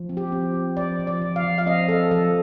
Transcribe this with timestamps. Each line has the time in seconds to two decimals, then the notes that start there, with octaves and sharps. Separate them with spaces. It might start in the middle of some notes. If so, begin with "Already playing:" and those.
Already playing: F3
0.09 C4
0.17 G4
0.32 C4
0.54 C4
0.77 F3 D5
1.00 F3
1.07 D5
1.22 F3
1.36 F5
1.44 F3
1.58 F5
1.66 C4 D#5
1.89 C4 A4
2.11 F3 A4